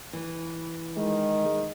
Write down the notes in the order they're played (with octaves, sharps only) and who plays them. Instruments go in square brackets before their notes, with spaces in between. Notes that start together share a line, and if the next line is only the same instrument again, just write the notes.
[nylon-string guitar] E3
[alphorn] D#3 [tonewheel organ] G#3